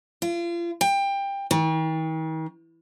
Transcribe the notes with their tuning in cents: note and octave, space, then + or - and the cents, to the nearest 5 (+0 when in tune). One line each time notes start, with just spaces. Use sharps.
F4 -35
G5 +20
D#3 +45